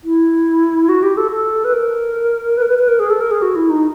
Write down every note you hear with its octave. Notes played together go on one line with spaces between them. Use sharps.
E4
F#4
G4
A4
A4
B4
A#4
B4
A#4
B4
B4
A#4
G#4
A4
A#4
G#4
F#4
E4
D#4